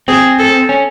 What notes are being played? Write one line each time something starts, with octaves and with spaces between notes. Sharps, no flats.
C4 G#4
A4
C#4